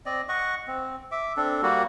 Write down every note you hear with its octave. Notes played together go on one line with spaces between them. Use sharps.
C4 D5 D#5
D#5 F#5 C#6
C4
E5 D6
C4 D4 A4
G3 A#3 F#4